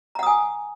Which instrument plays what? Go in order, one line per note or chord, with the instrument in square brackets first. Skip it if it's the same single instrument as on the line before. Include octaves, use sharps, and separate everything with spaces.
[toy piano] A#5
F#5
D#6
G#5